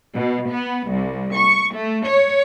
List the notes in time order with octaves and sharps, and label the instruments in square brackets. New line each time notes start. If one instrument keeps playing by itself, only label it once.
[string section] B2
B3
C2
C#6
A3
C#5